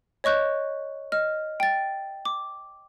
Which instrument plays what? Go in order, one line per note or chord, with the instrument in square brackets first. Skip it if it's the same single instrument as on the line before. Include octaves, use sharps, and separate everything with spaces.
[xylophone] C#5 D#5 C#6 F#6 G6
D#5 F6
G5 A6
D6